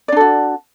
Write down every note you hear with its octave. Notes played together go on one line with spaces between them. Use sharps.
D4 F#4 A4 D5